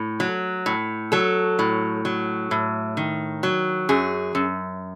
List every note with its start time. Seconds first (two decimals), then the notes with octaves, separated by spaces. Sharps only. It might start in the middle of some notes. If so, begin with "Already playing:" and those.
Already playing: A2
0.20 F#3
0.66 A2
1.12 F#3 A4
1.59 A2
2.05 F#3
2.51 A2
2.97 D#3
3.43 F#3
3.89 F#2 G#4
4.35 F#2